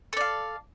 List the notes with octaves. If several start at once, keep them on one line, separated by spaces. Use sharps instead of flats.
A4 D5 F5